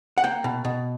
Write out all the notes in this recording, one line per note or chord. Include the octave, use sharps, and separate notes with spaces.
F#5
A#3 G5
B2
B2